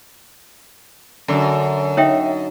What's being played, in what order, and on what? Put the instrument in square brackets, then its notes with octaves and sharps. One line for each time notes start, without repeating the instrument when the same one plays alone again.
[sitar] F#2 [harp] D3
[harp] D#4 [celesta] C#5 E5 G5